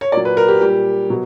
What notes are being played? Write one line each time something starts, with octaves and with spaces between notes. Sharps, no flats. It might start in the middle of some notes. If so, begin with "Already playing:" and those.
C#5
A#2 F#3 D5
B4
A#4
G4
A#2 G3 G4
B2 F#3